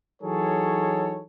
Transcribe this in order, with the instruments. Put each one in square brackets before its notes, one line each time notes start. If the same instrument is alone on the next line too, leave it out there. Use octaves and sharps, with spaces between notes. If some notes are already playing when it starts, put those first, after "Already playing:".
[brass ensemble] E3 F#3 D#4 G#4 A4 C#5